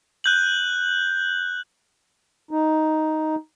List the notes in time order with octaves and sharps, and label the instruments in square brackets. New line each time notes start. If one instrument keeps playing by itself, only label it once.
[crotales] F#6 G6 F#7
[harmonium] D#4